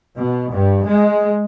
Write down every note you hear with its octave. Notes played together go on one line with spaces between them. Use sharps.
B2
G2
G#3